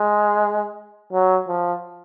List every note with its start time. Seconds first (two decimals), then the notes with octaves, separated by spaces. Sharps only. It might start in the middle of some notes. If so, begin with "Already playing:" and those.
Already playing: G#3
1.13 F#3
1.48 F3